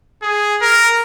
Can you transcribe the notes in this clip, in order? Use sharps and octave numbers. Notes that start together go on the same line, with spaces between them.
G#4
A#4